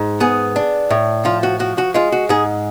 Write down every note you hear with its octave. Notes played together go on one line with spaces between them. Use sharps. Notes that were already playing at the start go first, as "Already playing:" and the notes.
Already playing: G#2
B3 G#4
D4
A2
F3 F4
F#4
F3 F#4
F#4
G#3 F4
F#4
G#2 G#4